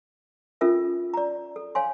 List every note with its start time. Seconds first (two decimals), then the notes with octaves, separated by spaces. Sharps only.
0.61 C#4 F4 A4 A#4 E5
1.14 D5 A#5
1.56 A4
1.75 C#5 F5 G#5 C6